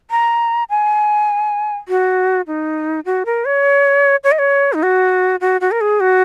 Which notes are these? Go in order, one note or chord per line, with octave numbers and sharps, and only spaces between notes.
A#5
G#5
F#4
D#4
F#4
A#4
C#5
C#5
D#5
C#5
D#4
F#4
F#4
F#4
A#4
G#4
F#4